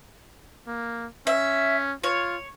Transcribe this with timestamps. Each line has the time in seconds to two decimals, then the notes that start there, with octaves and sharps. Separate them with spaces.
0.67 A#3
1.27 C#4 E5
2.03 F4 C#5